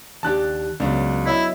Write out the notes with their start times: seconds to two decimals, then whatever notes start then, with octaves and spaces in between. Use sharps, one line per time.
0.23 D#2 D4 G4 A5 F#6
0.80 C#2 F#3 B3 D4
1.26 E4 C#5 D#5 E5